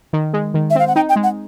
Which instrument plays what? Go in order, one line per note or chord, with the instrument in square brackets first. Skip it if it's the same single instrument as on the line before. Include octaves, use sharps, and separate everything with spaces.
[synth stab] D#3
G#3
D#3
[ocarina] E5
[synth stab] C4 [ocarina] F5
[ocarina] F#5
[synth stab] D#4 [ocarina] G5
[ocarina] G5
[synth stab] G#3
[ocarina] F#5